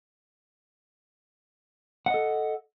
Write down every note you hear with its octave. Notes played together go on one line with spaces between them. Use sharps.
A4 D#5 F#5